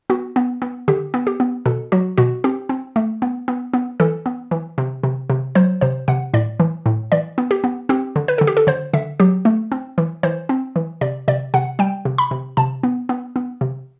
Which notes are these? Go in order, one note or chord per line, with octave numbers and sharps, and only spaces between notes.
B3 F#4
B3
B3
D3 G4
B3
G4
B3
B2 A4
F#3 F#4
B2 F#4
C4 G4
C4
A3
B3
B3
B3
E3 A4
B3
E3
C3
C3
C3
F#3 C5
C3 C5
C3 F#5
A2 D5
E3
A2
E3 D5
B3
G4
B3
C4 G4
D3
B4
D3 A4
G4
A4
D3 C5
D3 E5
F#3 G4
A3
C4
E3
E3 C5
C4
E3
C3 D5
C3 D5
C3 F#5
G3 G5
C3
B5
C3
C3 A5
B3
B3
B3
C3